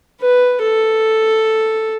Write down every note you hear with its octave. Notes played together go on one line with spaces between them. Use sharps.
B4
A4